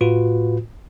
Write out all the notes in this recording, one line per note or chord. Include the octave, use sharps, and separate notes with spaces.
A2 F4 F#4 B4